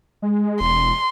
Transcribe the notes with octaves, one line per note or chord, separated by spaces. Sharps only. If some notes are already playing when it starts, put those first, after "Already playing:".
G#3
E1 C6